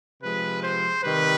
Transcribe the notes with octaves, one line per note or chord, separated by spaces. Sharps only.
C3 F3 G#3 B4
C5
C3 D#3 G3 B4